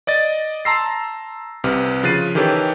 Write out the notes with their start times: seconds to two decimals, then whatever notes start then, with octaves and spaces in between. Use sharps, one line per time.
0.07 D5 D#5 A6
0.65 A5 A#5 C6 E6 A#6 C7
1.64 C2 C3 B4 F6
2.03 C#3 F3 F#6 A6 C7 D#7
2.35 D#3 E3 G4 A4 B4 C#5